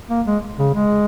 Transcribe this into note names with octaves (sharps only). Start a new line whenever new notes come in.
A#3
G#3
C#3
G#3